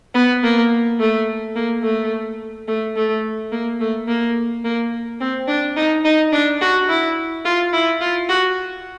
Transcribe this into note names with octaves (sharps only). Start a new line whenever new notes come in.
B3
A#3
A3
A#3
A3
A3
A3
A#3
A3
A#3
A#3
C4
D4
D#4
D#4
D4
F#4
E4
F4
E4
F4
F#4